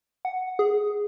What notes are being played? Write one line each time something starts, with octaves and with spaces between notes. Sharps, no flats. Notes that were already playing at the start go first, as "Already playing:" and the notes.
F#5
G#4